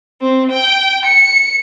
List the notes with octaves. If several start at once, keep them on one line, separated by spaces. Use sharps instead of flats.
C4
G5
C#7